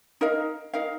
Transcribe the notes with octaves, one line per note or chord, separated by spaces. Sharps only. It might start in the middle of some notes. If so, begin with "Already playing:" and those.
D#4 A#4 F5
D#4 A#4 F5